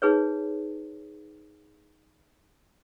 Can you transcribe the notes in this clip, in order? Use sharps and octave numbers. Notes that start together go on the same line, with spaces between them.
D#4 G#4 B4 C#5